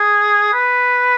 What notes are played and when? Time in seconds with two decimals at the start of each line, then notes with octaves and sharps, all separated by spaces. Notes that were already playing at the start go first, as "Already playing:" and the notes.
Already playing: G#4
0.53 B4